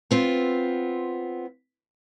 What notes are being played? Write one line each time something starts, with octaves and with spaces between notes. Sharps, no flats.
B3 C4 F4